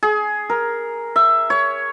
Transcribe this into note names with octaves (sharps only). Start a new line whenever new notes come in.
G#4
A#4
E5
C#5